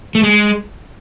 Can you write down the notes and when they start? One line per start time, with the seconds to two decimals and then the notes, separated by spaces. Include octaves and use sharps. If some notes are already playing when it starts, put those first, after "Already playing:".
0.15 A3
0.23 G#3